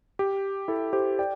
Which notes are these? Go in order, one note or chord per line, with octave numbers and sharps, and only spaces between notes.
G4
E4 A4
G4 C5
D5 G5